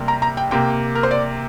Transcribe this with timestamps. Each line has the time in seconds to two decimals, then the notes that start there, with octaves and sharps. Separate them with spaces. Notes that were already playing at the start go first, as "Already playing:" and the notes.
Already playing: C3 G3 A#3
0.08 A#5
0.22 A#5
0.37 G5
0.51 C3 A#3 G5
0.95 A#4
1.03 C5
1.11 D5